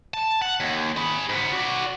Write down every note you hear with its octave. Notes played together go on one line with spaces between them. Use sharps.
A5
F#5
D#2
G#4 B5
G#2 B3
F#4 D5